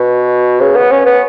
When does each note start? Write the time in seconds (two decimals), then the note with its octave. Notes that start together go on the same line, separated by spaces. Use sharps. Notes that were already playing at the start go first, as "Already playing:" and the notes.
Already playing: B2
0.61 C#3
0.76 B3
0.91 C#4
1.06 B3